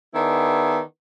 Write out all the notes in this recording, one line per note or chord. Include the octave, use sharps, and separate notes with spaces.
D#3 B3 D4 E4 G#4